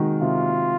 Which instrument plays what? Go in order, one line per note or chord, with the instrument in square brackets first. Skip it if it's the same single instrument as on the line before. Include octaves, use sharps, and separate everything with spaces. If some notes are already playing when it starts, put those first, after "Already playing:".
Already playing: [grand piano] C3 D#3 G#3 D#4 F#4
[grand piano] C3 [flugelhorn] F4